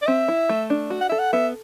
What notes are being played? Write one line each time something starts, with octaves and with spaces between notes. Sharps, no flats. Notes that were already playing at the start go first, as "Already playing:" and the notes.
D5
C4 E5
E4
A3
D4
F#4
F#5
A4 E5
F#5
B3 E5